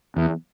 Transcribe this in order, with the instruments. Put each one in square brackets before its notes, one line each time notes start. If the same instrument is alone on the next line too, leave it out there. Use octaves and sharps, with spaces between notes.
[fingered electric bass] E2